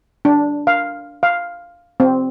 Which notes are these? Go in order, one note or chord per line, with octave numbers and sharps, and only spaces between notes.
D4
F5
F5
C4